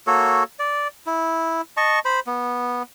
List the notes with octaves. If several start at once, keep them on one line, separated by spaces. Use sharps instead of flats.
A#3 F#4 A4 C#5
D5
E4
D#5 A5 C#6
C5 B5
B3